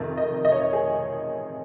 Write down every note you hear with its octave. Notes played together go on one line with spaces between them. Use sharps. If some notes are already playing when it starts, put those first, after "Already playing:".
Already playing: F2 C3 D#3
D#5
D#5
C#5
D#5
G#4